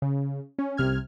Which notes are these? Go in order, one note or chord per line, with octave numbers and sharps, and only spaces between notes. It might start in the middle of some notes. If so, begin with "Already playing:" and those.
C#3
C#4
C2 C3 F6 G#6